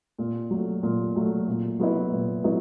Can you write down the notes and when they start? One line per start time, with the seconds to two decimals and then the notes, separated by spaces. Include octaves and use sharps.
0.18 A#2
0.51 F#3 A3
0.83 A#2
1.16 F#3 A3
1.47 A#2
1.79 F#3 B3 E4
2.12 A#2
2.44 F#3 B3 E4